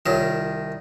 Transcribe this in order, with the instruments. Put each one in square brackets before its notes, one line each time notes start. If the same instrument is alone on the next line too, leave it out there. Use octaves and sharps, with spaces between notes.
[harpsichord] C2 D#3 [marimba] F4 C#5